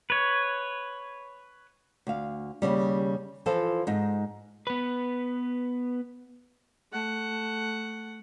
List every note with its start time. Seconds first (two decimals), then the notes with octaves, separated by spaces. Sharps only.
0.10 B4 C#5
2.07 D2 F5
2.62 D#2 G#2 C#3 G3
3.46 E3 F3 F4 A4 C5
3.87 G#2 D#4
4.67 B3 B4
6.92 A3 F#5